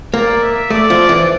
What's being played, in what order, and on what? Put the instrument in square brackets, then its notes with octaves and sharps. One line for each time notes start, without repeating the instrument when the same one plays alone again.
[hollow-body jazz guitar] A#3 [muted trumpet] D5
[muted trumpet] E5
[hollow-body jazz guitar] A3 [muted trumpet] D5
[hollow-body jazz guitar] F3
E3